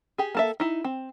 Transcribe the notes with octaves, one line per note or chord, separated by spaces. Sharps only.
G4 G#4
A#3 A4 E5
D#4 E4
C4